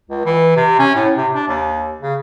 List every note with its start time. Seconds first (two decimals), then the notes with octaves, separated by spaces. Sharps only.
0.09 C#2
0.25 E3
0.56 C3
0.79 C#4
0.95 A2
1.17 C3
1.34 D4
1.48 D#2
2.01 C#3